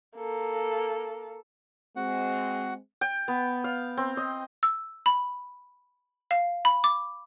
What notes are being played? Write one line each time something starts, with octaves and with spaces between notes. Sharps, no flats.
A#3 A4
G#3 C4 F#4 F#5
G5
B3
F5
C4
D#5
E6
B5
F5
B5
D6